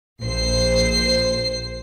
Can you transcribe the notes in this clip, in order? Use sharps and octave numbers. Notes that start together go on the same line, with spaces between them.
A#1 C5 C7